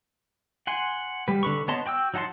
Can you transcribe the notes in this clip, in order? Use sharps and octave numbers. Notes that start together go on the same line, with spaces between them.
F#5 G#5 C6
G3 B4
D3 B4 C#6
B3 C#5 D#5 A5 C6
F#4 G5 D6 E6
F#3 D#4 F#5 A5 C6